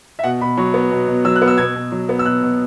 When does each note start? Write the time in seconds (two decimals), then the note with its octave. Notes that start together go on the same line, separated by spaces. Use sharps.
0.19 E5
0.24 B2 F#5
0.41 B2 B5
0.57 F#3 C#6
0.74 B3
0.91 B2
1.08 B2
1.25 F#3 E6
1.36 F#6
1.42 B3
1.48 E6
1.58 B2 G#6
1.75 B2
1.92 F#3
2.09 B3
2.19 E6
2.25 B2 F#6
2.42 B2